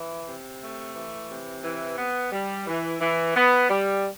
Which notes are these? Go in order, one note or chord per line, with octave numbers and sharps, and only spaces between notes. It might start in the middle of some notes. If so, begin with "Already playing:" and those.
Already playing: E3
C3
A3
E3
C3
E3
B3
G3
E3
E3
B3
G3